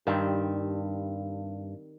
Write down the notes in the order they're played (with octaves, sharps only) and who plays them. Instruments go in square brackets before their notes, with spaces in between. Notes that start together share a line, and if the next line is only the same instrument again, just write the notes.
[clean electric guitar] G2 [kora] D#3 G3 C4